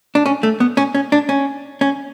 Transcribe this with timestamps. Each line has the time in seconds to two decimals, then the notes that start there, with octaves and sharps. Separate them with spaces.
0.15 D4
0.26 C#4
0.43 A3
0.60 B3
0.77 C#4
0.95 C#4
1.12 D4
1.29 C#4
1.81 C#4